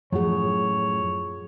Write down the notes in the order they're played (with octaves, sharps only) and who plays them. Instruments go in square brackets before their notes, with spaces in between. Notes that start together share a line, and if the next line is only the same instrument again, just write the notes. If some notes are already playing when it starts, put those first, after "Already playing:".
[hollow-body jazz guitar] F#2 A2 F#5 [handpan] F3 G#4 [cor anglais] C#5